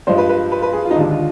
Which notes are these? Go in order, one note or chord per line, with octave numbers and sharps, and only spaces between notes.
G2 F3 G#3 C5
B4
B4
B4
B4
G#4
F4
D#4
D#2 D3 G#3 D4
F4